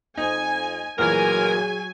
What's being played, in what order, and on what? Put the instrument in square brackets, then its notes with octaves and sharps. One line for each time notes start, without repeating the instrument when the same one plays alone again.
[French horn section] F2 [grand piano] D#4 C5 [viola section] G#5
[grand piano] A1 A#2 E3 [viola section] F#3 G#5 [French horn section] G#4 [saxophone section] A#4